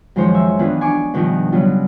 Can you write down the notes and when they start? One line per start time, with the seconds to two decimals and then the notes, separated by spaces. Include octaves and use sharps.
0.16 F#2 D#3 F3 G#3 C5 C#5
0.35 E5 A#5
0.59 D#3 E3 B3 D4 F4 B4
0.81 D4 G#5 C#6 D6
1.14 G2 B2 D#3 F3 F4
1.52 C#3 F#3 G3 B3 D4 F4